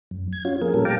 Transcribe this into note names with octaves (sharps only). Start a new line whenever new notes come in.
F#2
G#6
C#4 F4 F#4
F3 A#3 G#4 A#4
A#2 G3 A#3 C#4 A4 A#4
F5 G5 A5 A#5 D6